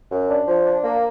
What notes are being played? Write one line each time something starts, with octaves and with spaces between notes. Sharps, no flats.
F#2
D4
F3
D4
A#3